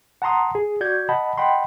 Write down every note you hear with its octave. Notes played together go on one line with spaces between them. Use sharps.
F#5 A5 A#5 C6 D#6
G#4
F#4 D5 G6 G#6
D#5 F#5 A5 B5
D#5 F#5 G5 B5 C6